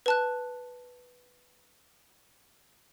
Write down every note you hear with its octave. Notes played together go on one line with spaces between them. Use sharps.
B4 A5 F#6